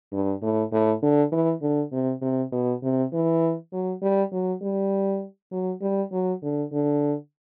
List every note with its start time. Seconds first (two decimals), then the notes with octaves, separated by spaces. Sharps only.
0.12 G2
0.42 A2
0.72 A2
1.02 D3
1.32 E3
1.62 D3
1.92 C3
2.22 C3
2.52 B2
2.83 C3
3.13 E3
3.73 F#3
4.02 G3
4.32 F#3
4.62 G3
5.52 F#3
5.81 G3
6.12 F#3
6.42 D3
6.72 D3